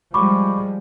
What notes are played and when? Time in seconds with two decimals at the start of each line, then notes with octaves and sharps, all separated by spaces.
0.14 F3 G3 G#3 B5 C#6 D6